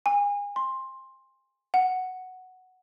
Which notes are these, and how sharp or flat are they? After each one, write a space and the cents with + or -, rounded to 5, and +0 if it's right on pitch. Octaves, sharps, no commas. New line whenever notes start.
G#5 -35
C6 +10
F#5 +0